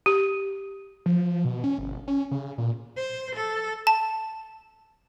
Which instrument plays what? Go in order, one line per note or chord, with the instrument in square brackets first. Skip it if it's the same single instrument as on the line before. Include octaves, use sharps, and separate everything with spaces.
[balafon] G4
[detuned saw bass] F3
B2
C#4
G1
C#4
C#3
A#2
[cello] C5
A4
[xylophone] A5